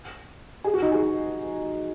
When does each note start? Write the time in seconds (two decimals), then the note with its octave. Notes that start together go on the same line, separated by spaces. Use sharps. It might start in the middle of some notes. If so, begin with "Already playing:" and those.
0.64 G#4
0.74 F#4
0.82 D#4
0.92 G#4